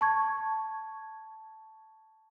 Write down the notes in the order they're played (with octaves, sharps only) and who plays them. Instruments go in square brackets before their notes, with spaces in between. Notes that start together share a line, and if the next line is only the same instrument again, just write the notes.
[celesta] A5 C#6 G#6